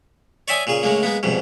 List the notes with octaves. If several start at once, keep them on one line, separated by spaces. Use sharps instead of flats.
C#5 D5 E5 G5 G#5 D#6
A#2 C#3 G#4
A2 C#3 G#3 A#3
G#3 A#3 B3
C2 F2 G#2 B2